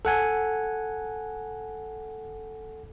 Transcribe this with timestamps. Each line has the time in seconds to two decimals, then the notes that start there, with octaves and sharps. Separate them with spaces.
0.05 A4 F#5 G#5